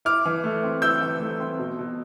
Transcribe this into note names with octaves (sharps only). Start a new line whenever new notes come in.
E4 D6 F6
E3
A3
C4
E4 E6 G6
E3
A3
C4
B2
B2